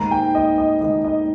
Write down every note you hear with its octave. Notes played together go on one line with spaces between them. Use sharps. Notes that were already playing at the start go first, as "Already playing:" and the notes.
Already playing: G#2 D#3 A#3 A#5
G5
D#5
D#5
G#2 D#3 A#3 D#5
D#5